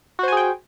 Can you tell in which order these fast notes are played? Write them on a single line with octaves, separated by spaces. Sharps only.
F#4 C5 G#5 G#4 G5